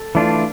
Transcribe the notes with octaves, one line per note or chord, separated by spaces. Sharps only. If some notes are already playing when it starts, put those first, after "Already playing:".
Already playing: A4
E3 A3 D4 F4